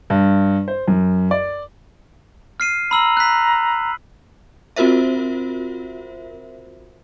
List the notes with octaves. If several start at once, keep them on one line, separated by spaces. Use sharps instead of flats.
G2
C5
F#2
D5
F6 C7 D#7
A#5 B5 E6 F#7
F#6 B6
C4 F4 F#4 A#4 C5 E5